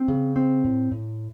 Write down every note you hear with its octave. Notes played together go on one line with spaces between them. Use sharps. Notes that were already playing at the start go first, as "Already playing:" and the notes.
Already playing: C4
C#3
C4
A2
A2